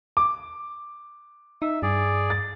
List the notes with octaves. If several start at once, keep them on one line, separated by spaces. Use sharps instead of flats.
D6
D#4 E5
G2 G#4 D5
A6